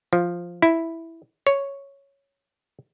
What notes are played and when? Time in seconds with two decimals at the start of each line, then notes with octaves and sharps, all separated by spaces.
0.13 F3
0.62 E4
1.47 C#5